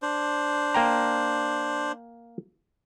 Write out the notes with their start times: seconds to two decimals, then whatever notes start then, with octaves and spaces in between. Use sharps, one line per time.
0.02 D4 C5
0.74 A#3 G5 A#5